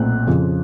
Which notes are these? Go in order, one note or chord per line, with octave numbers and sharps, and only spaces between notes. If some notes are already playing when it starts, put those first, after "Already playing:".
Already playing: B1 A#2 A3 C4 F#6
F2 C#3 F3